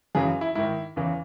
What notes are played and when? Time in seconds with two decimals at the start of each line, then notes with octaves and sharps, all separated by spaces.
0.15 F#2 C#3 E3 G#4
0.41 E4
0.55 G#2 D#3 E4
0.96 E2 C#3 E3